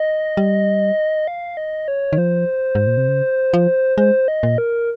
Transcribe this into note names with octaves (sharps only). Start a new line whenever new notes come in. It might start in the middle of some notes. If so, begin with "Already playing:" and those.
Already playing: D#5
G3
F5
D#5
C#5
D#3
F3 C5
G#2
A#2
C3
C#3
F3
G#3 C5
D#5
A#2
A#4